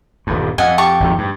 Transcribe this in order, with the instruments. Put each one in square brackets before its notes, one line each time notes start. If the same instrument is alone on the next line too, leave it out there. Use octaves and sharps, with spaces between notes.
[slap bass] D#1 G2
[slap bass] F2 [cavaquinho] D#5 F#5 G#5
[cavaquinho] G4 A5 C#6
[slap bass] G#1 F2 D#3
G2